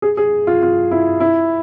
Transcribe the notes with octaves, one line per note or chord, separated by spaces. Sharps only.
G#4
G#4
F4
F4
E4
E4